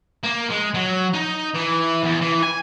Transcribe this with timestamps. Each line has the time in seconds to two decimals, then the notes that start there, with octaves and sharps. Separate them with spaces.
0.23 A#3
0.49 G#3
0.74 F#3
1.14 D#4
1.55 E3
2.03 E2
2.22 E3
2.43 G#5